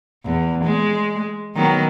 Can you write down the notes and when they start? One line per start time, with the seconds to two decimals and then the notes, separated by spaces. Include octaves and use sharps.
0.25 E2
0.64 G#3
1.56 D#3 F#3 B3